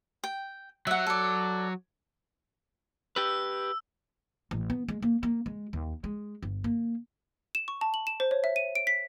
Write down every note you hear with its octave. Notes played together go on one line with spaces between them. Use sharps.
G5
F#3 E5 F#5
A4 D5
G4 B4 E6
A1
B3
G#3
A#3
A#3
G#3
D#2
G#3
G1
A#3
E7
C#6
A5
F#7
E7
C5
C#5
E5
D#7
D7
B6